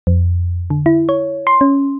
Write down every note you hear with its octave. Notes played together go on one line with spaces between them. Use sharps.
F2
D3
E4
C#5
C6
C#4